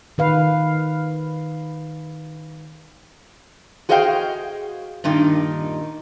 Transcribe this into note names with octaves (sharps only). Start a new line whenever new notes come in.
D#3 B4 F5
F#4 G#4 C5 D#5 F5 G5
G2 A#2 D#3 D#4